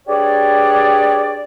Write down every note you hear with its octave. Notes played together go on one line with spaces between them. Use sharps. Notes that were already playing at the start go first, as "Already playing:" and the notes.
D4 G4 G#4 B4 C#5 D5